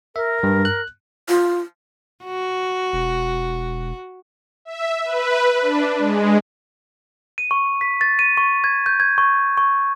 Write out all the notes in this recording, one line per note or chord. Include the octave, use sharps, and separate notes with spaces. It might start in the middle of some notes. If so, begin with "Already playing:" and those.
A#4 E5
G2
F#6
F4
F#4
E1
E5
B4
D4
G#3
D#7
C#6
B6
A6
D#7
C#6
G#6
G6
G#6
C#6
C#6